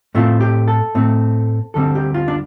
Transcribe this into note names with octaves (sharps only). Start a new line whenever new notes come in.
A2 A3 C4 F4
G4
A4
A2 A3 C4
D2 D3 G3 C4 A4
G4
F4
D4